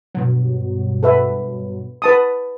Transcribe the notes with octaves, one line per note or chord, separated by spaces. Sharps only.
G2 B2 F#3
A4 B4 E5
B4 A5 D#6